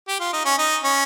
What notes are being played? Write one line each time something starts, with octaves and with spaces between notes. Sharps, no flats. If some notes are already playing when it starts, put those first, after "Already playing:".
G4
F4
D#4
C#4
D#4
C#4